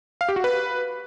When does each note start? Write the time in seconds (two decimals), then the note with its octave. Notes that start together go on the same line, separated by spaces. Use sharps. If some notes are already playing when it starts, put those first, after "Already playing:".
0.21 F5
0.29 G4
0.36 F#4
0.44 B4